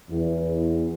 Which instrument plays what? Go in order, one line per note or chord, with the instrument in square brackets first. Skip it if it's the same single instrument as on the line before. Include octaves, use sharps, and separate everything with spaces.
[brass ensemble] E2